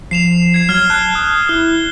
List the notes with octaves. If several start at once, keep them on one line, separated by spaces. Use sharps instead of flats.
F3 C7 E7 F7
G#6 C7
F#3 F6 G#6 G7
A5 F#6
D#6
E4 G7